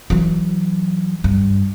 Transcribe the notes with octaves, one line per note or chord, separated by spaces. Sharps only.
E3 F#3
G2